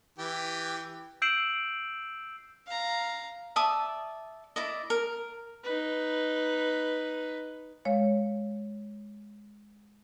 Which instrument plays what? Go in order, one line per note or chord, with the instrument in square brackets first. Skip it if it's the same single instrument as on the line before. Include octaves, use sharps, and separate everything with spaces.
[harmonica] E3 G4
[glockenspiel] E6 G6 C7 D7 E7 F#7
[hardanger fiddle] F5 A#5
[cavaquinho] D5 E5 A5 D#6
E4 D5 D#5
A#4
[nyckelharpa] D#4 B4
[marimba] G#3 C#5 F5